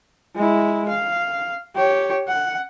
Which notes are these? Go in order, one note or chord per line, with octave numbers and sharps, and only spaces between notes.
G#3 E4
F5
G4 C#5
F#5